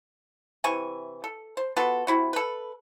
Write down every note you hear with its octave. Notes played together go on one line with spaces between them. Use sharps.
C3 E3 G#5 C#6
A4
C5
B3 F4 F#4 A4
C3 E4 F#4
A4 B4